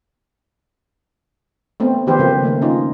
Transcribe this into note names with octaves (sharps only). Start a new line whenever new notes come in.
A3 B3 C4
D#3 F3 G4 B4 C5
C#3 G3 C4 A4 A#4
D#3 A3 A#3
C#4 D#4 F4